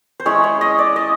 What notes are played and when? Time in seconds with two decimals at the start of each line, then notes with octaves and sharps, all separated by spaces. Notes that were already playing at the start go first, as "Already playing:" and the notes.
0.20 C5
0.26 G#3 C#4 E4 C#5
0.44 C#5
0.61 D#5
0.79 D5
0.96 D#5